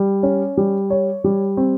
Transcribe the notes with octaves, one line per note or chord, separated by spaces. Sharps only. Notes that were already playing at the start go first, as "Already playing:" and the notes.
Already playing: G3
C#4
G3
C#5
G3
C4